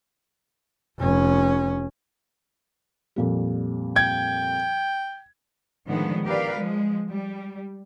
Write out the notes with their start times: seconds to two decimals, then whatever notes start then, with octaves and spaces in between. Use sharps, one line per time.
0.99 F1 C#4
3.16 F2 A#2 G3
3.96 G5 G#6
5.87 A2 D3 D#3 F3 G#3 B3
6.25 G4 A#4 B4 D5 F5
6.57 F3 G#3
7.09 G3